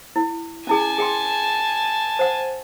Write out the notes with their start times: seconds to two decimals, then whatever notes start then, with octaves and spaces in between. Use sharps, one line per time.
0.16 E4
0.67 C#4 E4 G#4 G#5 A5
0.98 G#4 G5 C6
2.19 C5 F#5